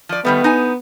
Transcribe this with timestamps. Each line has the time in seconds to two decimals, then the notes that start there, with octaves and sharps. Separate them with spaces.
0.09 F3 D5
0.25 D#3 G3 A3 B3
0.44 D#4 G#5